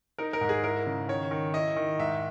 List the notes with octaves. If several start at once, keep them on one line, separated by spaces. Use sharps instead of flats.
D#4 A#4
A#4
G#2
G#4
E4 A#4
C#3
D#3 C#5
D#3
E4 D#5
D#3
G#2 E5